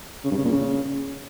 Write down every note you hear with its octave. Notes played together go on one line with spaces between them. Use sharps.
C#3
G2
C#3
A#2
C#3